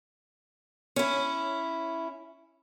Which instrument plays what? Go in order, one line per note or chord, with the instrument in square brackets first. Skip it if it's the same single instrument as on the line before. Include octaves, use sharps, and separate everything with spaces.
[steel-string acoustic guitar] C#4 E4